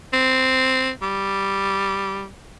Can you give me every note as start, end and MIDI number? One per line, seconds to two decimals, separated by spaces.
0.13 0.90 60
1.02 2.25 55